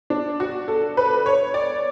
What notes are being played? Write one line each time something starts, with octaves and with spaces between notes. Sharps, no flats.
D4
F#4
A4
B4
C#5
D5